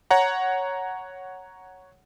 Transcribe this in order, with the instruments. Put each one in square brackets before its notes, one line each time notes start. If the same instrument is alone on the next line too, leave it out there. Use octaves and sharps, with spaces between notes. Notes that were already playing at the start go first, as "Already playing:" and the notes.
[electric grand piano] C#5 F#5 A#5